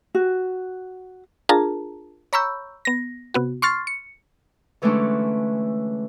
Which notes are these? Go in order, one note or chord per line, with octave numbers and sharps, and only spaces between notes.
F#4
D4 F4 G#4 A#4 A5 A#5
C#5 A#5 B5 C#6 E6 G6
B3 A#6
C3 B3 F#4
C6 C#6 F6 A6 C7
C#7
D3 E3 G#3 A3 C#4 D4